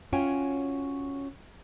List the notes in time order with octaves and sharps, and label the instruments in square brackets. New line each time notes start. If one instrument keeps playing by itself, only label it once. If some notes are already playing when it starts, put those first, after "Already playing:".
[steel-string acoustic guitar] C#4 F4 F#4 C#5 G5 G#5